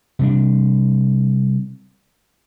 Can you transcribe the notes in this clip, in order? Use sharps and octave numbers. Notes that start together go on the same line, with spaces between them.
C3 G3 D4